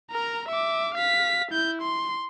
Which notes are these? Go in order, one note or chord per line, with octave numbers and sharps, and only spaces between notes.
A#4 A#5
E5 D6
F5 B6
E4 G6
C6